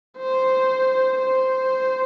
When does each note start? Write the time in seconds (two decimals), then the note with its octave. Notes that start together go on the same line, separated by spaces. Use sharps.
0.18 C5
1.19 C5